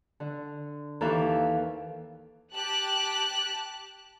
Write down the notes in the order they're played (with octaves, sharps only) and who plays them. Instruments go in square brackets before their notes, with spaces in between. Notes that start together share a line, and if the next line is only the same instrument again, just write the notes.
[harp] D3
D#2 E3 A4 E5 F5
[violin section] G4 A5 F#6